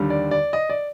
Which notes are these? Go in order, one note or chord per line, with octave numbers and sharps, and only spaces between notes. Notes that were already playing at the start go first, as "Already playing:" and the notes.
Already playing: D#2 D3 G3
D5
D5
D#5
D5